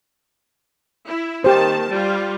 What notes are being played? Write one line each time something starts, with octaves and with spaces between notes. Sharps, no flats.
E4
D#3 A#3 G4 C5 A5
G3 F4